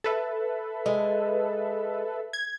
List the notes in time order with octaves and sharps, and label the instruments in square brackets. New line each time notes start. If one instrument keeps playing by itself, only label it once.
[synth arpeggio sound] A4 B4 E5
[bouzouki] G#3
[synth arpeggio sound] G#6